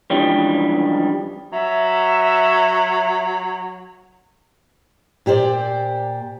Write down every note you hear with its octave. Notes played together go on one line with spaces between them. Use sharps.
G2 C#3 E3 F3 G3 G#3
F#3 E5
A#2 G4 C5 D5